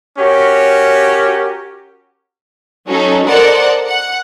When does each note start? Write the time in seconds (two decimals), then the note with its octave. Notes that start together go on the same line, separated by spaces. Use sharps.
0.18 C#4 F#4 G4 A#4 C#5
2.88 F#3 C#4 D#4 F#4 A4
3.27 A4 A#4 C5 D5 D#5 F#5
3.87 F#5